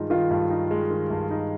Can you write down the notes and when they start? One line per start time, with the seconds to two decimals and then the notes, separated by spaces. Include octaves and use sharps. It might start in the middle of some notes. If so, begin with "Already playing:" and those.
Already playing: G2 D#3 G#3 D#4 F4
0.10 D#3 F4
0.31 G2
0.50 D#4
0.71 G#3
0.90 D#3
1.10 G2
1.31 D#4